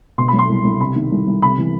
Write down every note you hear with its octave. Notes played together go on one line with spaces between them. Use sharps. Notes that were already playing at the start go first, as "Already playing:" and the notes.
B2 C6
F#3 B5
C6
C2
C2
C3 B5
D#3
C2
C2
C3 B5
E3